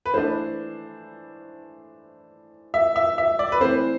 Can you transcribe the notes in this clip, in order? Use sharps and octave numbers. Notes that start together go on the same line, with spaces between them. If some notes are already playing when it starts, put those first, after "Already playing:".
B4
E3 A3 D4 C5
E5
E5
E5
D5
B4
E3 A3 C4 C5